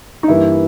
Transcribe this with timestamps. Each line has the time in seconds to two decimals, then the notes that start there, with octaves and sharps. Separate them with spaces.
0.23 D#4
0.28 G2 E3 A#3 E4